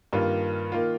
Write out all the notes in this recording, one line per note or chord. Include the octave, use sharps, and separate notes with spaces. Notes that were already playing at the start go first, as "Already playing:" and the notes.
G2 D#3 A#3 F4
D#3 A#3 F4